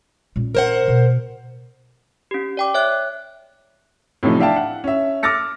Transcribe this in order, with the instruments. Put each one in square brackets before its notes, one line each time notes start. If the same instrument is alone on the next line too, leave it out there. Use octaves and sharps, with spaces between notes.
[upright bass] A#2 C#4
[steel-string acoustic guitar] A#4 C5 F#5
[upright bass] B2
[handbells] C#4 G4
D5 G5 D6
C#5 E5 F#6
[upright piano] A2 C3 E3 F3 D#4
D4 E4 E5 F5 G5 A5
F#5
C#4 E5
D6 E6 F6 A6 A#6 C#7